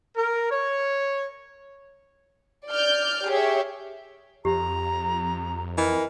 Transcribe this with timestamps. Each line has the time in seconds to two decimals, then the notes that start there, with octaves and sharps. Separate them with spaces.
0.16 A#4
0.51 C#5
2.69 D5 F6 G6
3.28 G4 G#4 C#5 E5
4.45 F2 G4 A#5
5.78 E3 A#4 D#5